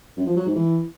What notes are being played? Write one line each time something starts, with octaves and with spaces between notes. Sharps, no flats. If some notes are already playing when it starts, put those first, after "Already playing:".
F#2
F3
F#3
G#2
E3